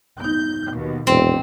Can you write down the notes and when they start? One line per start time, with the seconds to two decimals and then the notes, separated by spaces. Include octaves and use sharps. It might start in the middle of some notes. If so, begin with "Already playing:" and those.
0.20 B3 D#4 G6
0.74 D#2 B2
1.07 E1 A#1 F2 C4